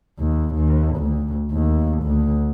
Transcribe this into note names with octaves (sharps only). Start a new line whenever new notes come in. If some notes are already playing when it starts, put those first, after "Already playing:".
D#2
D#2
D2
D#2
D2